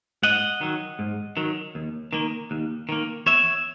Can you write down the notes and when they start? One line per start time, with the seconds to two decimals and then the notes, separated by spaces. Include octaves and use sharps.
0.23 G#2 D#5 F#5
0.61 D#3 F#3
0.99 G#2
1.37 D#3 F#3
1.75 D#2
2.13 D#3 A#3
2.51 D#2
2.89 D#3 A#3
3.26 E2 C#5 E5